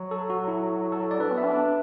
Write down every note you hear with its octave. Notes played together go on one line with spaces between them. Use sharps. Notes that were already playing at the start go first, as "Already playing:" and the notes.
Already playing: F#3
A4
F#4
E4
A4
D5
D4 B4
B3
E5
D4